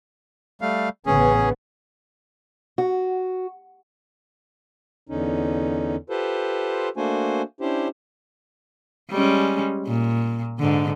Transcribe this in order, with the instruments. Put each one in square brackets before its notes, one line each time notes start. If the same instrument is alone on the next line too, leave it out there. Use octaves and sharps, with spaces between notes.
[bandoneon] G3 A3 F5
[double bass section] A1 C#3 B3 [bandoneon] C#4 G#4
[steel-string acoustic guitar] F#4
[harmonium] E2 D3 C#4 D#4
F4 G4 A4 B4 C5
A3 A#3 D4 F#4 C5 G#5
C#4 D4 E4 G4 C5
[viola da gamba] G3 G#3 C#4
A#2
G#2 D3